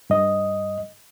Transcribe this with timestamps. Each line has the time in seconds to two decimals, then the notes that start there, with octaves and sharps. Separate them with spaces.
0.10 G2 D#5